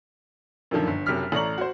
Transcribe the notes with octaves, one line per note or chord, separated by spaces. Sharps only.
F#2 A#2 D3 D#3 F3
G1
F#1 C3 F#3 A#4 F6 B6
A1 A3 D5 A#5 C#6 F#7
F#4 C5